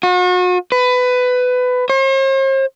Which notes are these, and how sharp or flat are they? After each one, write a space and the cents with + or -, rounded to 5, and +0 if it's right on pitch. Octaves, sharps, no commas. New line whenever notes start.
F#4 -40
B4 +20
C5 +45